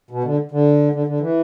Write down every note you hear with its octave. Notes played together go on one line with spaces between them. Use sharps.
B2
D3
D3
D3
D3
E3